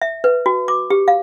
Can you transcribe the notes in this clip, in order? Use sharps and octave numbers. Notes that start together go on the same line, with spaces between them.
E5
B4
F#4
D6
G4
F5